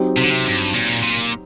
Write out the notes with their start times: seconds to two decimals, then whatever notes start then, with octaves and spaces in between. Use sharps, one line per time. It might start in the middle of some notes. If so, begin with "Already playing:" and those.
Already playing: F#3 C4 D#4 G4
0.17 C3
0.23 D3
0.30 C3
0.45 G2
0.74 A#2
1.03 A#2